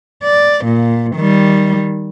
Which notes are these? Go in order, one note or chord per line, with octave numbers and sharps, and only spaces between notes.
D5
A#2
D#3 G3